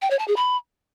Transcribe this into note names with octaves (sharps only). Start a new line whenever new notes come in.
G5
C#5
A5
G#4
B5